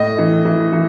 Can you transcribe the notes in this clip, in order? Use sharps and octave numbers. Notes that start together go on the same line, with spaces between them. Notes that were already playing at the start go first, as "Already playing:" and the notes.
Already playing: A2 D#5
E3
E3
E3